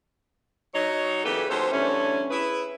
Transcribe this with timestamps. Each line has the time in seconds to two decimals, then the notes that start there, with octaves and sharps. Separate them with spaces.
0.74 F#3 D#4 C#5
1.24 E2 C#3 A#3 G4 A4 B4
1.49 D#2 F#3 A4 C5
1.71 E2 G2 D3 A3 C#4
2.31 E4 G#4 B4